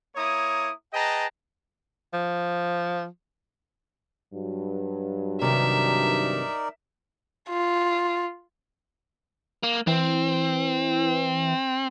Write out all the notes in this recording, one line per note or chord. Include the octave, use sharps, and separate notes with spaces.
A#3 E4 C#5 A#5 D#6
G#4 B4 D#5 G5 A5 A#5
F3
G2 F#3
C3 D#3 D#4 A#4 D5 E5
F4
A#3
E3 C4